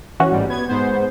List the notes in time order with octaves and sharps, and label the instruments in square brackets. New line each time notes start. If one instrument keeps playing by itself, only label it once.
[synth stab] E3 C#4 F#4
[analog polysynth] A1 G#2 G3
B3 G#6
G#2 B3 C5